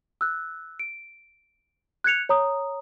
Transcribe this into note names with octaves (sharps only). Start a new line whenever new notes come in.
E6 F#6
D7
F#6 G#6 C#7 F7
C#5 A#5 D#6